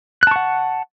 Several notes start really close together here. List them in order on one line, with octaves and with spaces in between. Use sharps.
F#6 A5 C#6 F#5